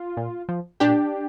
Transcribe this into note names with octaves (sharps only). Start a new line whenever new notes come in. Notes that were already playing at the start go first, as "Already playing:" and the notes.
Already playing: F4
A#2
F3
A#2 D4 G4